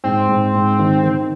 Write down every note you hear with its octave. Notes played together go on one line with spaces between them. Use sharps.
G#2 C4
G#2
G#2
D#3
D#3